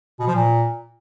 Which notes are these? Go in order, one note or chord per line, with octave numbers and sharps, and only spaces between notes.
B2
F3
A#2